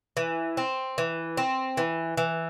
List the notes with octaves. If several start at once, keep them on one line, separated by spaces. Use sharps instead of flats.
E3
C4
E3
C4
E3
E3